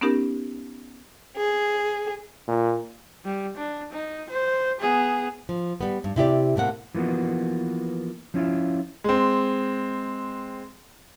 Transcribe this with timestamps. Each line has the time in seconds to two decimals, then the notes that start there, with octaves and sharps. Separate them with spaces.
0.01 B3 C#4 D#4 G4 A#4
1.37 G#4
2.48 A#2
3.25 G3
3.57 D4
3.92 D#4
4.30 C5
4.80 B3 G#4
5.49 F3
5.81 G3 B3
6.04 G2
6.16 C3 E4 G4 D5
6.56 A2 C3 A#3 F#5
6.95 E3 F3 A#3 B3 F#4
8.34 F3 C#4 E4 F4
9.04 G#3 C4